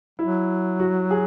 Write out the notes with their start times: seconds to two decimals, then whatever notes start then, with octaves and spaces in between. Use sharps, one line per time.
0.19 F#3 E4
0.80 F#4
1.11 G#4